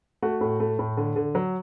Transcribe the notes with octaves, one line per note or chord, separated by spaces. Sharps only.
A3 F#4
A2
A3
A2
D3
D3
F#3